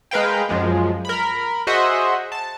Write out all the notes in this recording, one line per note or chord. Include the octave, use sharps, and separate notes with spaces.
G#3 A#4 B4 F5 G5
F#2 F3 G#3
A#4 B5
F#4 G#4 C5 D#5 E5 F#5
A5